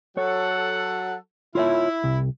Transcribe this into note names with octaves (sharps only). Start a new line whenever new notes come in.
F#3 A4 C#5 F#5
E4 F4 C#5 E5
C2